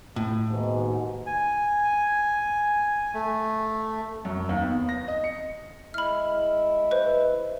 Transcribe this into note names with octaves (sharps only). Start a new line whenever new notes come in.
A2
D#2 G#2 B2
G#5
A3
F#2
D#2
B3
A#6
D#5
C#7
G#3 E4 E5 B5 F6
B4 C5